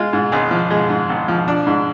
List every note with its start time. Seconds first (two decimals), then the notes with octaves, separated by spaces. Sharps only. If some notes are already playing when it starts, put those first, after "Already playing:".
Already playing: G#3 F4
0.13 G#2
0.32 G#1 G#4
0.51 F3
0.71 G#3
0.90 G#2
1.09 G#1
1.28 F3
1.48 D4
1.67 G#2